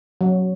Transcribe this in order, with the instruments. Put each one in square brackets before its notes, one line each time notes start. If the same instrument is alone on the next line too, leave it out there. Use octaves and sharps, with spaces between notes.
[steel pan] F#3